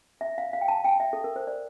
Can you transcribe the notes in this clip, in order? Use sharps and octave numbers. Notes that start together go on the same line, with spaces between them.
E5
F5
F5
G5
A5
G5
E5
A4
A#4
C5
D5